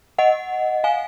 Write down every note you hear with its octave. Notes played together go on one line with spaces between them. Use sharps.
D#5 F#5
F5 G#5